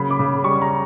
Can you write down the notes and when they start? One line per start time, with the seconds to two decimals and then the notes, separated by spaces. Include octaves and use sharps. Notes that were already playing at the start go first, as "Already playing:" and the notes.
Already playing: C#3 F#3 A#3 B5
0.10 D6
0.19 C#3
0.44 G3 C#6
0.62 A#5